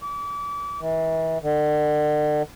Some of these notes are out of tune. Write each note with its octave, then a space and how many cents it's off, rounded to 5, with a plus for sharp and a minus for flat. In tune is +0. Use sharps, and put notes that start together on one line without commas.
D6 -35
E3 -35
D3 +40